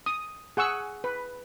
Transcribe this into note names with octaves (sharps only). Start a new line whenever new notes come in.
D#6
G#4 F#5 C#6 E6
B4